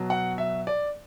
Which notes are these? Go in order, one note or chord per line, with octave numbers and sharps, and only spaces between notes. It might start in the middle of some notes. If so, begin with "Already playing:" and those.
Already playing: B2 F#3
F#5
E5
D5